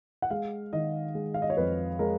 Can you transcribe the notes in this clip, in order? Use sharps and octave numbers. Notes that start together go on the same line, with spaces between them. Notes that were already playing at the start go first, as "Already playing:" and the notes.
F#5
G#3 F5
D#3 D#5
G#3
F5
D#5
C#5
F2 B4
G#3 A#4